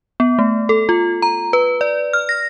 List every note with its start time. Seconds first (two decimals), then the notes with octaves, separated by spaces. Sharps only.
0.20 B3
0.39 A3
0.69 A4
0.89 F4
1.22 A#5
1.53 B4
1.81 D5
2.13 F6
2.29 A#6